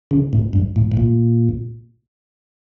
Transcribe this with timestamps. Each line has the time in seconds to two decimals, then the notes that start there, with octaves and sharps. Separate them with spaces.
0.11 C#3
0.33 A2
0.53 G2
0.76 A2
0.92 A2
0.97 A#2